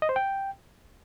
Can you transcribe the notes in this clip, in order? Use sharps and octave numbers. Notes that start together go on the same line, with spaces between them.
D#5
C5
G5